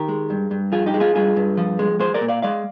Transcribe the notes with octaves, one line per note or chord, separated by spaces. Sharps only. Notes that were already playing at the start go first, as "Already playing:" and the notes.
Already playing: D#3 G4 A#4
G#3
G2
G2
F3 F4 G#4
D#4 G4
G#3
F4 G#4
G2 F4 G#4
G2
F3
G#3
G#3 G#4 C5
A#4 D5
A#2
D5 F5
G#3 D5 F5